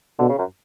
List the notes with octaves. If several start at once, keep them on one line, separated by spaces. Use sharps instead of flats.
B2 D3
C#3
F#2